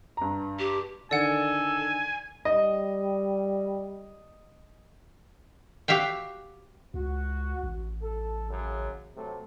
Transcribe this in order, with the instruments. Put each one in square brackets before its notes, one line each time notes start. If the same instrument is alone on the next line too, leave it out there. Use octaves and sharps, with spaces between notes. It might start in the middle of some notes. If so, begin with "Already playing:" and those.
[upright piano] G2 A#5
[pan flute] G4
[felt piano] D3 D#3 [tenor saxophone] A4 [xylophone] D5 F#5 [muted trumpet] G#5
[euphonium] G3 [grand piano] D#5
[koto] F#4 G4 E5 F5 G5
[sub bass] C#2 [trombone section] F#4
[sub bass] A1
[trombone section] A4
F#2 C#3
C3 F#3 A3